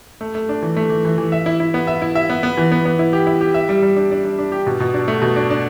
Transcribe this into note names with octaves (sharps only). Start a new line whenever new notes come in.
A3
A3
D4
E3
A3
E3
E3
E3
E5
E4
E4
B3
E5
E4
E5
B3
B3
E3
B3
B3
E4
G4
E4
G4
E5
G3
G3
D4
D4
D4
D4
G4
B2
B2
D4
A3
B2
D4
D4